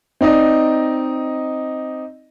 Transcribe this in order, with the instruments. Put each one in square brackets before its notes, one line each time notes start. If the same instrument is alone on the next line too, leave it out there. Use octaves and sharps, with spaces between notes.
[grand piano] C4 D#4 D5 D#5